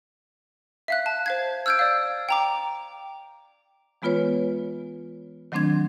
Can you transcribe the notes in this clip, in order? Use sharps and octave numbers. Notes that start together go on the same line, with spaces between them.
E5 F5 F#6
A5
C5 F5 G#6
E6 F6 G6 G#6 D7
D5 F5
G5 A#5 D6
E3 G#3 B3 F4 B4 C#5
D#3 F#3 A3 C4 D4 G#6